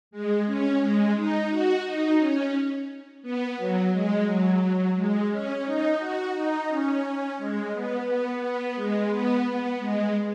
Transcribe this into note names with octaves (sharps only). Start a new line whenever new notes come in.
G#3
C#4
G#3
D#4
F#4
D#4
C#4
B3
F#3
G#3
F#3
G#3
C#4
D#4
F#4
D#4
C#4
G#3
B3
B3
B3
G#3
B3
B3
G#3